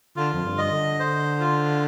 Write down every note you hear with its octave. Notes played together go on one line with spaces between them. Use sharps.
D3 F4
F2
G2
D#5
D3
C5
F4